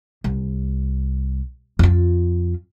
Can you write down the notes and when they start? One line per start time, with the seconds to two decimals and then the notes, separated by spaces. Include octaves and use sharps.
0.24 C2
1.79 F2 F4